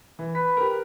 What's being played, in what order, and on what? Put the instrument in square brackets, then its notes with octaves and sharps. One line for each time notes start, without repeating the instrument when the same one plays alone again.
[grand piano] E3
[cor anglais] B4 [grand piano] B6
[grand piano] G4 A#4